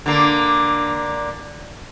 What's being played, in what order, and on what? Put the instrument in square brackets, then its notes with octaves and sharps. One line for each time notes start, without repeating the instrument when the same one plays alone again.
[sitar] D3 A#3